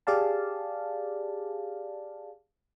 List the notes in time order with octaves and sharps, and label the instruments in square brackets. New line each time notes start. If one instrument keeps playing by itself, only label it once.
[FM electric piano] G4 G#4 D5 F5 A5